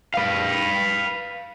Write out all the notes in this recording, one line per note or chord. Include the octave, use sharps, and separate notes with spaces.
B4 F5